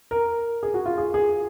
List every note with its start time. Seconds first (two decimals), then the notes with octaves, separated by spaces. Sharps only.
0.11 A#4
0.63 G#4
0.74 F#4
0.86 F4
0.98 G#4
1.14 G#4